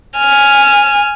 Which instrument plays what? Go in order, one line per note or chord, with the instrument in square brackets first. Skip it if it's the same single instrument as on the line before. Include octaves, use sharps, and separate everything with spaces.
[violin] G#5 F6